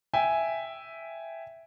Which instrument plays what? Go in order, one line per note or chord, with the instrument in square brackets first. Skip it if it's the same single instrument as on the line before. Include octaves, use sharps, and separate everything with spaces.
[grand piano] E5 G5 G#5